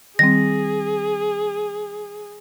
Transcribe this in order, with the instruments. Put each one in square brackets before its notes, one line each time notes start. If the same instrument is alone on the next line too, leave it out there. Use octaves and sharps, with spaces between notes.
[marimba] D#3 G3 C4 [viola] G#4 [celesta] A#6